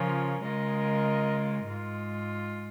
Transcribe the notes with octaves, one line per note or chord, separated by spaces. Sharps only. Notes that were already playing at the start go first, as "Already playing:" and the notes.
Already playing: C#3 F3 C#4 F4 A#4
C#3 G#3 F4 A#4 D#5
G#2 G#3 F4